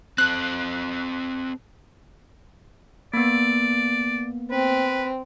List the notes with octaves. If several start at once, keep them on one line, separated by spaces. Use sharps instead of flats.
C4 A4 F#6
A#3 B3 D5
C4 B4